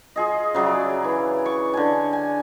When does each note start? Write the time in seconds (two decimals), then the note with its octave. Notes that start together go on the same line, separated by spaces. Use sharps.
0.16 F4 G#4 D#5
0.54 C#3 F#3 D5 E5
1.04 E3
1.46 C#6
1.74 D3 G#5
2.13 G#5